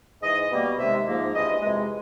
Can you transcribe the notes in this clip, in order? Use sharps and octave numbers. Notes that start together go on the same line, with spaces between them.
G#2 E3 G#3 D#5
B2 G3 A#3
C3 D#3 G#3 E5
G#2 F3 A#3
G2 E3 G#3 D#5
F2 C3 E3 G#3